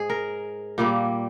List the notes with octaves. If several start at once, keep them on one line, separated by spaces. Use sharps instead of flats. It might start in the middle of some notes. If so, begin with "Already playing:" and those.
Already playing: G#2 G#4
A#4
A#2 G3 A#3